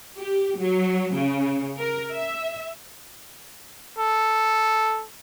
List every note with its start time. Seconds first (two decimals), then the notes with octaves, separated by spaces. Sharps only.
0.17 G4
0.58 F#3
1.14 C#3
1.78 A#4
2.11 E5
3.99 A4